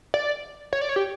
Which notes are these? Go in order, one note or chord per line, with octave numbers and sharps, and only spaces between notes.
D5
C#5
D5
C#5
G4